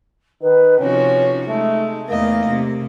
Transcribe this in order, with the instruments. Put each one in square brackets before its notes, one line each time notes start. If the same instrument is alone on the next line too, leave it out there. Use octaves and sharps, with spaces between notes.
[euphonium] D#3 [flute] B4
[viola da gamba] C3 F3 F#4 [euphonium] C#4 [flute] D#4
[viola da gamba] G#3 [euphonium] A3
[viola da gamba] E2 A3 D#5 [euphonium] A#3
[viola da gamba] C3